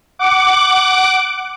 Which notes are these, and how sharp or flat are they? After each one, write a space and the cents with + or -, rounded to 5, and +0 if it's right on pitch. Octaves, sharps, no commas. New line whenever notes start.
F#5 +15 D6 +0